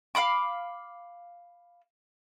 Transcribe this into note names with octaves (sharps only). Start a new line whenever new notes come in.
F5 F#5 B5 D6